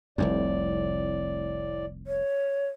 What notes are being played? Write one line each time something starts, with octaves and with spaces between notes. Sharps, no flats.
F1 C2 F2 A2 D5
C#5